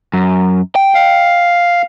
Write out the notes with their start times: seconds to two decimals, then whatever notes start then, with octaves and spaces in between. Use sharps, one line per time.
0.14 F#2
0.76 G5
0.94 F5